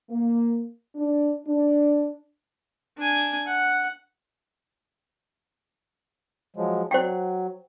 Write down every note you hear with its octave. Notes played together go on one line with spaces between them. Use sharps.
A#3
D4
D4
D4 G#5
F#5
F3 F#3 G#3
F#3 C5 F#5 G5